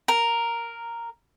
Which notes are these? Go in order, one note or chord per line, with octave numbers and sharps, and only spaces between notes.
A#4